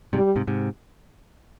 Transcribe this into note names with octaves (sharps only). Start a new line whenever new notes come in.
G#2 C3 G3
G#2 C3
G#2 C3